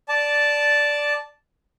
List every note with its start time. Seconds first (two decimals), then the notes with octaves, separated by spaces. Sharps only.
0.09 D5 A5